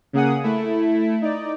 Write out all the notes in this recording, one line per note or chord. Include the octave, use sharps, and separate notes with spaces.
C#3 A#3 G#4 F#5 D#6
A3 E4
D#4 D5